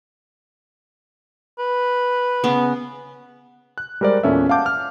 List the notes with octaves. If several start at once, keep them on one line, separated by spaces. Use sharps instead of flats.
B4
C#3 B3
F#6
G3 G#3 A#4 C5 D5
E2 A#2 C#4 A4 E5
F5 F#5 A5 D6 G6
F6